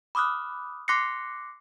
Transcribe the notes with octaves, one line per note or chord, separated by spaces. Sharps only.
B5 D6 D#6 F6 F#6
C6 D6 F#6 A#6 C7 C#7